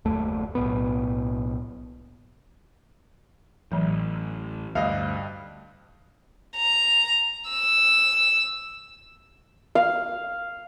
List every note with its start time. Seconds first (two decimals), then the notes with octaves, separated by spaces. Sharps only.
0.05 F#1 D#2 A3
0.55 B1 A2 B3
3.72 A1 A2 E3 F#3
4.75 D2 G2 D#5 F5
6.57 A#5
7.50 E6
9.75 F5